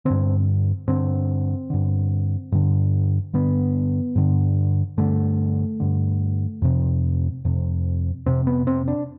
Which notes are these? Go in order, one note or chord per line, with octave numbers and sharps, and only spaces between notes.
G2 D3 C4
G2 D3 C4
G2 D3
G2 D3
G2 D3 B3
G2 D3
G2 D3 A3
G2 D3
F2 C3
F2 C3
F2 C3 C4
B3
C4
D4